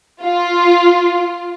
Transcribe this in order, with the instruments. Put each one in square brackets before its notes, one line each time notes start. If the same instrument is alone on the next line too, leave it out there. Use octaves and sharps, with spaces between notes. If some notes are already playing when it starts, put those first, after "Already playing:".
[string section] F4